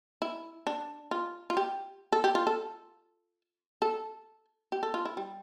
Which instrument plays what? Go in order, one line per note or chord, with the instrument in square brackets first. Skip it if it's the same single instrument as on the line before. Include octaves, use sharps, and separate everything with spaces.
[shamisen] E4
D4
F4
F4
G4
A4
G4
F4
A4
A4
G4
A4
F4
E4
G3